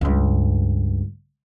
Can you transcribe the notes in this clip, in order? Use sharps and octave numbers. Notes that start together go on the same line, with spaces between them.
C#2 G2